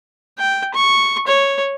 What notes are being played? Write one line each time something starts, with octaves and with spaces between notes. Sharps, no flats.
G5
C#6
C#5